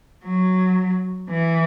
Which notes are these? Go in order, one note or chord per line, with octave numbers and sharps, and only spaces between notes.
F#3
E3